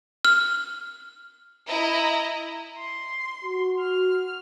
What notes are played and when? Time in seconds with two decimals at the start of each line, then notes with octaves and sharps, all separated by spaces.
0.25 F6
1.66 E4 D#5 A#5
2.78 C6
3.45 F#4
3.79 F6